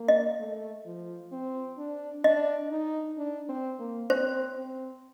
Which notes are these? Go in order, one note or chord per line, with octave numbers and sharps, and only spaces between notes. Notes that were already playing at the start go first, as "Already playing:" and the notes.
Already playing: A#3
D#5
A3
F3
C4
D4
D4 D#5
D#4
D4
C4
A#3
C4 C5
C4